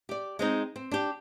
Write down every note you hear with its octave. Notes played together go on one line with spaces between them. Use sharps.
G4 D5
G#3 C4 D#4
C4
D4 G4